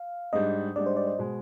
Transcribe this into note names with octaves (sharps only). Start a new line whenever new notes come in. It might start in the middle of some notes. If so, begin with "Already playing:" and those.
Already playing: F5
G#2 G3 D4 D#5
G#2 G3 D4 D5
C5
D5
C5
B2 G#3